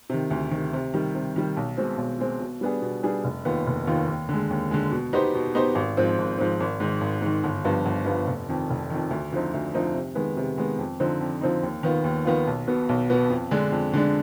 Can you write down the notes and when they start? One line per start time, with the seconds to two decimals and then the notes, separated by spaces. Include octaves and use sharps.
0.10 C3 D#3
0.31 D2
0.51 C3 D#3
0.73 C3
0.94 D#3 G3
1.15 C3
1.36 D#3 G3
1.57 B1
1.77 B2 G#3 C4
1.98 B1
2.19 B2 G#3 C4
2.40 B2
2.61 G3 B3 D4 G#4
2.82 B2
3.03 G3 B3 D4 G#4
3.24 F1
3.45 D#2 D#3 B3 F4
3.67 F1
3.87 D#2 D#3 B3 F4
4.08 D#2
4.29 D3
4.34 G#3
4.51 D#2
4.71 D3 G#3
4.91 B2
5.13 B3 D#4 G4 C5
5.34 B2
5.55 B3 D#4 G4 C5
5.75 G#1
5.97 G#2 F3 C4
6.18 G#1
6.38 G#2 F3 C4
6.60 G#1
6.80 G#2 D#3
7.01 G#1
7.22 G#2 D#3
7.44 G1
7.64 G2 F3 B3 F4
7.86 G1
8.06 G2 F3 B3 F4
8.27 F1
8.49 F2 D#3
8.70 F1
8.90 F2 D#3
9.11 D2
9.32 D3 F3 C4 D#4
9.54 D2
9.74 D3 F3 C4 D#4
9.94 C3
10.15 D#3 G#3 B3
10.37 C3
10.58 D#3 G#3 B3
10.78 F2
11.00 D3 F3 C4 D#4
11.21 F2
11.41 D3 F3 C4 D#4
11.63 D#2
11.83 D#3 B3 F4
12.04 D#2
12.25 D#3 B3 F4
12.47 B1
12.67 B2 B3
12.89 B1
13.10 B2 B3
13.30 F2
13.51 D3 G#3 D4
13.72 F2
13.93 D3 G#3 D4